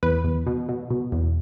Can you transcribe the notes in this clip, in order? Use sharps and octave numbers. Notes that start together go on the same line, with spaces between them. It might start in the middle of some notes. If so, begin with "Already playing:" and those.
E2 B4
E2
B2
B2
B2
E2